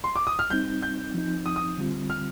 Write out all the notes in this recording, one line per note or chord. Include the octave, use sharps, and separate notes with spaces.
C6
D6
D#6
F6
G3 C4 D#4 G6
G6
F3 C4 D#4
D#6
D#6
D3 G3 C4 F4
F6